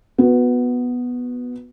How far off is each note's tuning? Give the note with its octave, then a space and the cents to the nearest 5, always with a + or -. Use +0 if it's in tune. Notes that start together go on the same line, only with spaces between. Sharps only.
B3 +0 F#4 -25